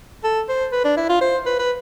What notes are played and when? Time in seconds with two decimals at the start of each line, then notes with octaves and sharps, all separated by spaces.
0.24 A4
0.49 C5
0.72 B4
0.84 D4
0.97 E4
1.09 F4
1.21 C5
1.46 B4
1.59 B4